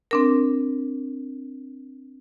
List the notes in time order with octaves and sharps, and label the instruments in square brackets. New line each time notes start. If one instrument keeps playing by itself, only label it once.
[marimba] C4 D4 A#4